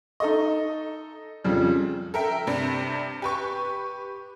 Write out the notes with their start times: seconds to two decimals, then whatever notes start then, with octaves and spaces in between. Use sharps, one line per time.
0.20 D#4 A4 D#5
1.44 F2 C#3 G3
2.14 A4 A#4 E5 G5
2.47 G2 C3 D4
3.22 G4 B4 C#6